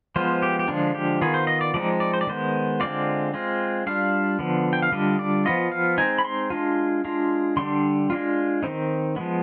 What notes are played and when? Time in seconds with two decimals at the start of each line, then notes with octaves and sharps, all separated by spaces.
0.16 F3 G#3 B3 F4 C5
0.42 G4
0.59 G4
0.68 D3 F3 G#3 D4 F4
0.94 G4
1.21 D#3 B3 F4 G#4
1.34 C5
1.47 D#5
1.61 D5
1.74 F3 G#3 C4 D#4 D5
2.00 D5
2.14 C5
2.21 D5
2.27 D#3 G#3 B3 C5
2.80 D3 G#3 C4 F4 D5
3.34 G#3 C4 F4
3.87 G3 D4 F4 F5
4.39 D3 F3 B3
4.73 G5
4.82 F5
4.92 D3 G3 D4 F4 D#5
5.19 D5
5.45 F3 B3 F4 D#5
5.72 F5
5.98 G#3 C4 D#4 G#5
6.18 B5
6.25 C6
6.50 G#3 D4 F4
7.05 G#3 D4 F4
7.57 D3 G3 D4 C6
8.10 G#3 D4 F4
8.63 D#3 G3 C4 D#4
9.16 F3 G#3 B3